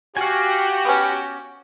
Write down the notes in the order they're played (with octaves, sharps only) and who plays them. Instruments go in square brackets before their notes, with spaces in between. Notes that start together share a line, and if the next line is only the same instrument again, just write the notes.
[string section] F#4 G5 [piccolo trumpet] G4 [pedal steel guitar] F5 G#5
[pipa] B3 C#4